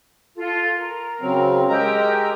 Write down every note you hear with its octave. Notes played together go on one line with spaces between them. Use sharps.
F4 A4
A#4
C#3 F#3 C4
G#3 G4 A#4 D#5 A#5 E6